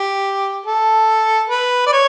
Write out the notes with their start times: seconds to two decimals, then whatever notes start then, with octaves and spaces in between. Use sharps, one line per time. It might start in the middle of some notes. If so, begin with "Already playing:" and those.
Already playing: G4
0.66 A4
1.50 B4
1.86 D5
1.93 C#5